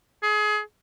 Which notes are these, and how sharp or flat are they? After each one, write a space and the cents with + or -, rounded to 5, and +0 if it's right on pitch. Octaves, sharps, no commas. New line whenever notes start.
G#4 +30